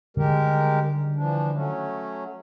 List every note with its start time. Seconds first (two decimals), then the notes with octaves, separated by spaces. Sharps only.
0.17 D3 D#3 G3 G#3 G4 A#4
1.16 E3 F3 D4
1.53 F#3 A3 C#4